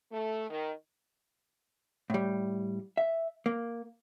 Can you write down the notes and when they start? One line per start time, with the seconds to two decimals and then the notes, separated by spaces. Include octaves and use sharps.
0.12 A3
0.50 D#3
2.10 A2 G3
2.97 E5
3.46 A#3